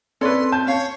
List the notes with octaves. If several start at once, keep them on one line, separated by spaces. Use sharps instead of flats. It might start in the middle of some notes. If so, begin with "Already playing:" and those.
C4 C#4 A4 B4 C#5 D5 C6
A5 G6
C#4 C#5 F5